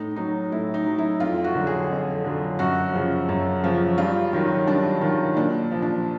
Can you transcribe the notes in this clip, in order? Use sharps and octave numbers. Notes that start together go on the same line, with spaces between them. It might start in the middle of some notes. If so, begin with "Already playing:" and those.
Already playing: A2 D#4
F#3 D#4
A2 E4
D#4
F#3
E4
F2 F4
F#4
D3 F#3
G#4
F2
D3 F#3
F#2 F#4
C#3 F3
F#2
C#3 F3
G2 F4
D#3 F#3
G2 D4
D#3 F#3
A#2 D4
F3
D4